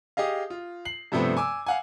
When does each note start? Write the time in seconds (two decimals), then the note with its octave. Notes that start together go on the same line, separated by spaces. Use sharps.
0.17 G4 G#4 D#5 F5
0.50 F4
0.85 C7 F#7
1.12 G2 C3 F3 A3 B3 C4
1.37 G#5 D6 E6
1.66 F5 F#5 G#5